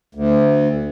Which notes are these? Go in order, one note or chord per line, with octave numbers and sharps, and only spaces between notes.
D2